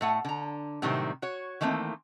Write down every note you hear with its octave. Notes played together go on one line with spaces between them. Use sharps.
A2 A3 F#5
D3 A#5
A2 C3 D#3 F#3 G3 C4
F#4 C#5
D#3 E3 A3 A#3 C4